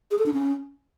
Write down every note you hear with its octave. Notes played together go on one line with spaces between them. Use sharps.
G#4
A4
D4
C#4